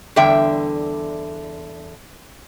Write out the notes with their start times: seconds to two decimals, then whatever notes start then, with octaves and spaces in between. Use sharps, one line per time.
0.16 E2 D3 G3 E5 G5